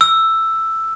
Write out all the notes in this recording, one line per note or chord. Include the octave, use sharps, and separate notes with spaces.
E6